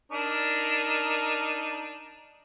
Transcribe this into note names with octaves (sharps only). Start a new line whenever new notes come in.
D4 D#4 A#4